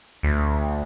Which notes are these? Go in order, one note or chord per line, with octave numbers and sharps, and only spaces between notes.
D2